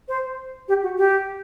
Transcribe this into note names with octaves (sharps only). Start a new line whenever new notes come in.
C5
G4
F#4
G4